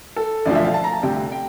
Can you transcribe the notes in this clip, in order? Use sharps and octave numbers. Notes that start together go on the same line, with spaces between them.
A4
E1 D2 D3 F3 D5
E5
F5
A5
A#5
A5
D2 C3 G3 G5
G5